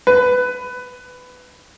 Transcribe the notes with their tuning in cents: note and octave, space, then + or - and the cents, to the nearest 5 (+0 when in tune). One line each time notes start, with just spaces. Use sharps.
B4 +15